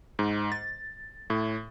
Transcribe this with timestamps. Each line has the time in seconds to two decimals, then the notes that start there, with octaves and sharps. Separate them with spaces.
0.19 G#2
0.52 A6
1.30 A2